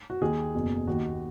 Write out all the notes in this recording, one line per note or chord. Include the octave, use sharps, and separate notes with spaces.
F#4
D#2 D#3 G#4
F#1 E2 B2
D#2 D#3 F#4